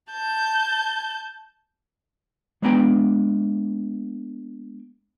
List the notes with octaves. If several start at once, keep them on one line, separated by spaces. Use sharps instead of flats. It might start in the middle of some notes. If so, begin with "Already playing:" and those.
A5 G6
G#3 A#3 B3 D4 G5 G#5